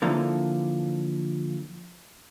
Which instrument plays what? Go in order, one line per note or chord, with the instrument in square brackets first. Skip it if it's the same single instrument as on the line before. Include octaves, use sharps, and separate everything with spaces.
[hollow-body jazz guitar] D3 E3 F3 A#3 A4